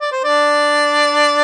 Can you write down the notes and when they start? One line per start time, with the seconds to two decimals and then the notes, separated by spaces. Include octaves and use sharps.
0.01 D5
0.12 C5
0.24 D4 D5